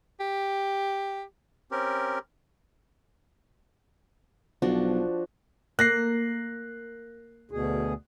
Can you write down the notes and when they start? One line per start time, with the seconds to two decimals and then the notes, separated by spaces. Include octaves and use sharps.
0.20 G4
1.71 C4 C#4 G4 A#4
4.62 B1 F3 D4 F#4
5.79 A#3 F#6 A#6 C7
7.51 D2 B2 G#4